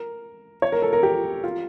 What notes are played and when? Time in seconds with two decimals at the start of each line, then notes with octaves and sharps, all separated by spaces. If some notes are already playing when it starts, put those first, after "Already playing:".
Already playing: A#4
0.62 C#5
0.72 A#4
0.82 A4
0.93 A#4
1.03 G4
1.44 F4